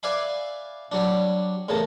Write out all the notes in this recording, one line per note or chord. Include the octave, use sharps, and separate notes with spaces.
B4 D5 E5 F5 G#5 B5
F#3 G3 D4
E2 A2 C#3 A#4 A5